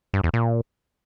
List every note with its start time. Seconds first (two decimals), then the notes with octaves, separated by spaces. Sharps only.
0.14 G2
0.24 E2
0.34 A#2